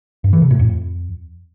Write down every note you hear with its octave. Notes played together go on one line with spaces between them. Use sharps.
G2
E3
C3
A2
F2